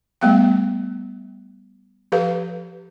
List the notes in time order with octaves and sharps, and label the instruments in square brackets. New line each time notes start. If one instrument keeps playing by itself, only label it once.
[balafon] G3 A3 B3 F5 G5
F3 G4 A4 B4 F5